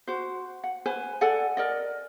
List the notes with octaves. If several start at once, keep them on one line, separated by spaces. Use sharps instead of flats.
F#4 C5
F#5
B4 C5 G#5
A4 D5 F#5 G#5
A#4 D5 D#5